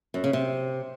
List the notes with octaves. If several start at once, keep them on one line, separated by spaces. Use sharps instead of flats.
F#2
C#3
C3